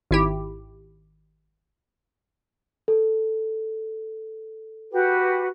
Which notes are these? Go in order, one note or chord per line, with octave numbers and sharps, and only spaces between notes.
G#1 E4 G4
A4
F#4 G4 B4